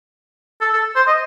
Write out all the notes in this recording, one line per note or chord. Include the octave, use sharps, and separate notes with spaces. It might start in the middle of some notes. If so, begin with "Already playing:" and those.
A4
A4
C5
D#5